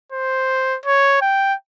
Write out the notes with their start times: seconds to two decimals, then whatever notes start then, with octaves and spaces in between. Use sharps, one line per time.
0.12 C5
0.86 C#5
1.22 G5